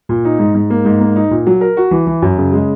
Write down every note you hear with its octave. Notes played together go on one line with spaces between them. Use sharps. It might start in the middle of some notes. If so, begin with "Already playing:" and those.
A#2
D#4
G#2
G#2
A#3
G#2
A#3
D#4
A#2
F#3
A#4
F#4
E3
E3
F#2
C#3
G#3